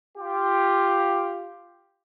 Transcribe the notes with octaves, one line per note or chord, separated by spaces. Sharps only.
F4 G4